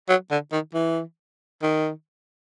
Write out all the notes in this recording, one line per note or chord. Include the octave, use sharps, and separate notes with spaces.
F#3
D3
D#3
E3
D#3